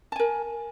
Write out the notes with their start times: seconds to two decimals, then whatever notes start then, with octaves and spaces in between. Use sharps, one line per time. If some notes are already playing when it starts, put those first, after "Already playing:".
0.12 A5
0.16 G#5
0.19 A#4